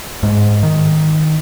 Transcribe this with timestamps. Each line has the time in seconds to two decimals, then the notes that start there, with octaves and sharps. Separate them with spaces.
0.23 G#2
0.63 D#3